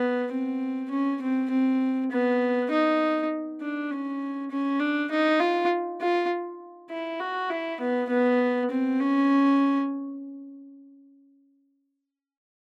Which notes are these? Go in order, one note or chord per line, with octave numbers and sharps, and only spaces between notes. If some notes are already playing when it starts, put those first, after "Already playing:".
Already playing: B3
C4
C#4
C4
C4
B3
D#4
D4
C#4
C#4
D4
D#4
F4
F4
E4
F#4
E4
B3
B3
C4
C#4